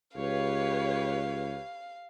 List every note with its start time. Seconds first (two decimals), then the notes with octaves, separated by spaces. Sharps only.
0.17 C#2 G4 B4 C#5 F5